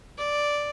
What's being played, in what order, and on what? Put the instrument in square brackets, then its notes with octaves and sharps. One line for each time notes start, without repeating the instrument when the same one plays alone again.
[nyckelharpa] D5